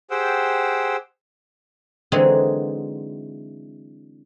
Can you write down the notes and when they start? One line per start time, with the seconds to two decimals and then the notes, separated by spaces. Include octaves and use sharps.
0.11 G4 G#4 C5 F#5 G5 E6
2.12 D3 E3 F#3 G#3 C4 D#4